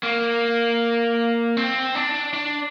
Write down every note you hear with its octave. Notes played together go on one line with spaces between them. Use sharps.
A#3
C4
D4
D4